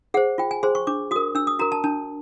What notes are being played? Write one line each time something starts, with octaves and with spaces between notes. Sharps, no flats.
G#4 C5 F#5
F4 G5
G#5
G#4 C5 C6
C#6
D4 D6
F#4 A#4 D#6
D4 E6
D#6
F#4 A#4 A#5
A5
D4 A5